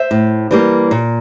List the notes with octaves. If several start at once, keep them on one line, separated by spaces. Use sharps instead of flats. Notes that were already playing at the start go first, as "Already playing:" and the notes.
Already playing: C5 E5
A2
E3 G3 A#3
A#2